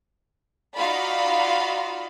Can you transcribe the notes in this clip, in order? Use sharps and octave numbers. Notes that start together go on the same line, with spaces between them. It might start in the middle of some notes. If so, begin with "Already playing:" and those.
D#4 F4 F#4 D5 F5 B5